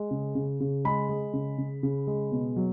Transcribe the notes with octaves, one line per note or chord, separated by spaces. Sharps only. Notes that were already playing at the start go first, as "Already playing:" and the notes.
Already playing: G#3
C#3
C#3
C#3
G#3 B5
G#3
C#3
C#3
C#3
G#3
B2
F#3